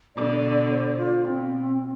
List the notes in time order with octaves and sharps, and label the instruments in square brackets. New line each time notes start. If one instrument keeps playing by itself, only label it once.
[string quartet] B2 D3 [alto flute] D5
[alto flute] D5
C5
F4
[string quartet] B2 [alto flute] C4